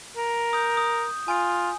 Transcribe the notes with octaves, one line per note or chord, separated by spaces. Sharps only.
A#4
D#6 G6
D#6
F4 G#5 D7